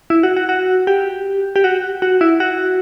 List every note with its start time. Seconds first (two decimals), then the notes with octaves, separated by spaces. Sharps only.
0.10 E4
0.23 F#4
0.36 F#4
0.49 F#4
0.87 G4
1.56 G4
1.64 F#4
2.02 F#4
2.21 E4
2.40 F#4